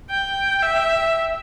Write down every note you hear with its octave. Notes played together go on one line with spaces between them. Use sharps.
G5
E5